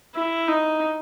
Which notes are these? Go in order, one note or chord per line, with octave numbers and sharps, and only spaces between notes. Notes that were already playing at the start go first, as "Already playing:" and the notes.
E4
D#4